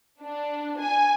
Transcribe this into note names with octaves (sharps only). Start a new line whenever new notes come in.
D4
G#5